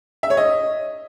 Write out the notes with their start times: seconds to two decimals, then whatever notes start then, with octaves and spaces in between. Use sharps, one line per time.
0.23 E5
0.30 C#5
0.37 D#5